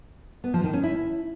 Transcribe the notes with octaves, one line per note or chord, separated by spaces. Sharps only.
B3
F3
D#3
C#4
E4